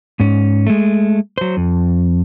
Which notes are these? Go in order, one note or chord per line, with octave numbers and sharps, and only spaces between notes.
G#2 C#4
G#3 A3
F#3 C5
F2